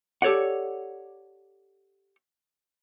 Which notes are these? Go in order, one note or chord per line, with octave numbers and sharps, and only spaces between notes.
G4 A4 C#5 D5 F#5